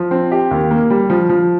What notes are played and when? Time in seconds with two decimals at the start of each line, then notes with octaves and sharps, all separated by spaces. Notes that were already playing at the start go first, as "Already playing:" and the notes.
Already playing: F3
0.11 C4
0.32 G4
0.51 D#2
0.71 A#3
0.90 G3
1.10 F3
1.29 F3